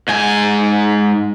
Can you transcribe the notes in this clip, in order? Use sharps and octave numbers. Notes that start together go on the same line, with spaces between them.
G#2 G#5